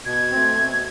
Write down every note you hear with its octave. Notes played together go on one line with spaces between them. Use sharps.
B2 G#6
A3 C4
B2